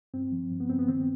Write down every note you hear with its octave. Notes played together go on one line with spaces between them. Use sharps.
G2 C4
F3
G2
B3
G2 C4
B3
D#3 C4